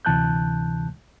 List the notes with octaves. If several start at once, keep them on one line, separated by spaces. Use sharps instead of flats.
D2 C3 E3 A5 F#6 G6